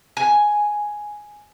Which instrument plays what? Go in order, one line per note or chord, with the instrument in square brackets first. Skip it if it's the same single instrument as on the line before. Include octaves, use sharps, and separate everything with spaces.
[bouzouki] G#5